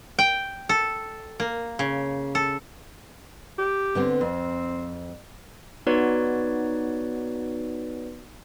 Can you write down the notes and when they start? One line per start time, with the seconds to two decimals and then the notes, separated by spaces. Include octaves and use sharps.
0.19 G5
0.69 A4
1.40 A#3
1.79 C#3
2.35 A4
3.58 G4
3.95 D3 B3 C4
4.21 F2 C4
5.87 B3 D#4 F#4 B4 C#5 D5